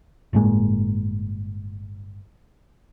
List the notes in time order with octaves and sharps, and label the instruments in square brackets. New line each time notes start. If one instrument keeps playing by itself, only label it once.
[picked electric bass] G1 A2 G#3 A#3